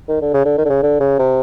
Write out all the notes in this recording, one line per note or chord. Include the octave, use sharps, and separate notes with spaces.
D#3
D3
C#3
D3
D#3
D3
C#3
D3
C#3
C3